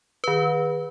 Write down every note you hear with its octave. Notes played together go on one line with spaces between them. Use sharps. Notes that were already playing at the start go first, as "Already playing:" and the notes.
D#3 B4